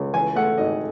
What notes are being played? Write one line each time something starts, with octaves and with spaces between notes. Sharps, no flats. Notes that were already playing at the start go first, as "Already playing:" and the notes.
Already playing: C#2
E3 G#5
A3 F#5
G#1 D#5